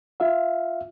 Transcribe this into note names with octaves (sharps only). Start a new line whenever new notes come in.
F4 E5 F5